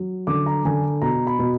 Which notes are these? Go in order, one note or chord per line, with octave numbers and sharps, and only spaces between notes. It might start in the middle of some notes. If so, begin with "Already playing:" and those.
Already playing: F#3
D3 D6
A#5
D3 G#5
B2 A#5
B5
B2